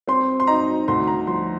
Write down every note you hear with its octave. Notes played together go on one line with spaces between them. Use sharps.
C4 C6
C6
D#4 A#5
D2 C6
A#5
F3 C6